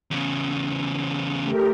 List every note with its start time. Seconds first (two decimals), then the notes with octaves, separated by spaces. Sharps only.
0.11 E2 C#3
1.42 A3 G4 A#4